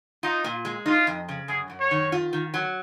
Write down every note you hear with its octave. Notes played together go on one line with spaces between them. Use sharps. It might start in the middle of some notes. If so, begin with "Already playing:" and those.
D#4 F4
A#2
G#3
D#4 F4
F2
C#3
F#2 G#4
F#2
C#5
D#3
F4
D#3
F#3